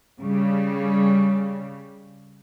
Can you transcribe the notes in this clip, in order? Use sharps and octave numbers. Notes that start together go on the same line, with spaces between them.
C#3 G3